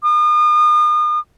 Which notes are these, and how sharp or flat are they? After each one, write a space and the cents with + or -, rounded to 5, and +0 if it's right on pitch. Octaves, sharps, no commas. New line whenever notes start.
D#6 -40